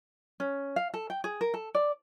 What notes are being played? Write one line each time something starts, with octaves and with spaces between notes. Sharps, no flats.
C#4
F5
A4
G5
G#4
A#4
A4
D5